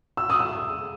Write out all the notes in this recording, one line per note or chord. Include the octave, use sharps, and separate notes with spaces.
E6
D#6
E6